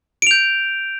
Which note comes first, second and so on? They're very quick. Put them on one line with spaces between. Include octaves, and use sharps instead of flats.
D7 F7 G6